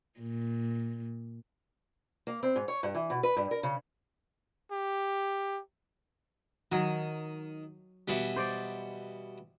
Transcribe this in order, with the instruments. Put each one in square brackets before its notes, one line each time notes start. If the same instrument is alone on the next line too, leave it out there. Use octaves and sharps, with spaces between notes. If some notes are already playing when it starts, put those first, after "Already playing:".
[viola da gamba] A#2
[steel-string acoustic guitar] A#3
C4
G#2
C#5
G2
E3
B2
B4
G2
A#4
C#3
[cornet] G4
[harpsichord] D#3 [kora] F#3
[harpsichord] B2 E3 G3
[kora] C5 D5